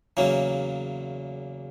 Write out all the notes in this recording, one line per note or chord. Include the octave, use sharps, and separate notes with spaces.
E2 C#3 F#3 A#3 C#4